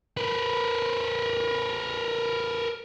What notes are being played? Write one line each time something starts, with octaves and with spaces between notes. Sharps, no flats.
A#4 B4